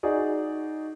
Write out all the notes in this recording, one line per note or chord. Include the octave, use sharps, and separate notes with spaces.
D#4 F#4 G#4 D5